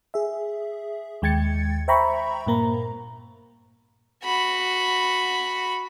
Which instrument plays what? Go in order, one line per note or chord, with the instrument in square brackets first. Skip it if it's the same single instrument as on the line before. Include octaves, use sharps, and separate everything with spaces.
[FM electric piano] G#4 E5
D#2 G#3 G5 G#6 A6 C#7
C5 E5 G5 A#5 B5 C#6
G2 A#2 A#3 A#5
[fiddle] F#4 B5